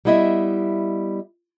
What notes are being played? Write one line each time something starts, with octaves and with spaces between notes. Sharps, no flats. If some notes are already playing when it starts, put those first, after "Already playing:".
G3 B3 E4 D#5 E5